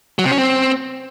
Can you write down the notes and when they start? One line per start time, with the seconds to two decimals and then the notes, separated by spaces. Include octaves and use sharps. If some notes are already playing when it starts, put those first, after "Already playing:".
0.19 F#3
0.25 C3
0.31 C#4
0.38 C4